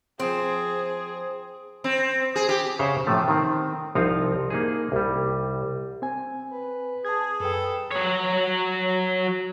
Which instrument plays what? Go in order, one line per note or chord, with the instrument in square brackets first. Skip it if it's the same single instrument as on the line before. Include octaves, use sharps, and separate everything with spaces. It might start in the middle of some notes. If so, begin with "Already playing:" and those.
[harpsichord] F3 [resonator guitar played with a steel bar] C4 [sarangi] G#4
[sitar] C4
G#4
G4
[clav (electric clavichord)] C#3 C5 C#5 E5 F#5 A#5
A2 C3 F3 A3
D#3 C4
C2 F3 C4 D#4 F5
A#3 D#4 G#4
C2 G3
[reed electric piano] C4 G#5
[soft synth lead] B4
[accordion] G#4 [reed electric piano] A5 G#6
[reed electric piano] F#2 G5 [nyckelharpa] A4 [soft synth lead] B4
[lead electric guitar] F#3 C#5